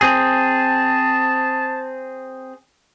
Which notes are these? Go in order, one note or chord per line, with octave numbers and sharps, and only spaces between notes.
C4 G#4 A5